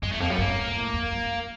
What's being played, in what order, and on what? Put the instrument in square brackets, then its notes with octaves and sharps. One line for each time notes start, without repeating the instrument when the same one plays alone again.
[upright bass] F#2 [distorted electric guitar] G#3
[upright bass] E2 [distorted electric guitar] A3
[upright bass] F2 [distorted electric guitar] A#3
[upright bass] F#2 [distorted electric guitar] B3
[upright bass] G2 [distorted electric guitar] A#3
[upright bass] G#2
A#2
A2
F2
F#2
F#2